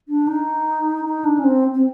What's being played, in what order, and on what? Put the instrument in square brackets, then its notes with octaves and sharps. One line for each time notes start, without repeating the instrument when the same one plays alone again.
[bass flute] D4
D#4
D#4
D4
C#4
C4
C4